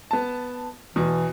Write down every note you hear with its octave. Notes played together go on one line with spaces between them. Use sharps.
B3 A5
E2 B2 E3